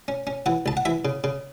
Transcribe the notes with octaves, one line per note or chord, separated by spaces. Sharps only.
C#4
C#4
E3 F#5
C#2 A5
F#5
E3 E5
C#3
C#3